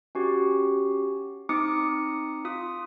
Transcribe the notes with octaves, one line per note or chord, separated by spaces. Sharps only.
C#4 F#4 G4
C4 D#4 D6 D#6 C#7
F4 D#6